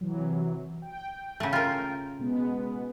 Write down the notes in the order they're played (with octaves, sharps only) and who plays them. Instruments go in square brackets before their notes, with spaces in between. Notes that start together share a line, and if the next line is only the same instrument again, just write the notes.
[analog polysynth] C3 E3 F#3
G5
[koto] C#3 A3
F4 A#4
[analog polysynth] B2 G#3 B3